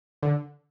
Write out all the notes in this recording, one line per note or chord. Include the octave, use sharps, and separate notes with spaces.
D3